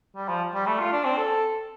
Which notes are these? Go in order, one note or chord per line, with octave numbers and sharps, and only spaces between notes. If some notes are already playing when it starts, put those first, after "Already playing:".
G3
F3
G3
A3
F4
D4
C4
A4